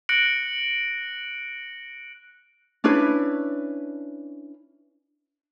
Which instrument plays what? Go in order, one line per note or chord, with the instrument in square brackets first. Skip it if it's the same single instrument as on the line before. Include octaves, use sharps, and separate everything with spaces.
[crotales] F#6 A#6 C#7 D7 F#7
[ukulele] C#4 D4 E4 B4